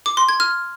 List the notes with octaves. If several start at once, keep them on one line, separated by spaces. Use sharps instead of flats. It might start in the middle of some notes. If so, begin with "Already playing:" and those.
D6
C6
G#6
F6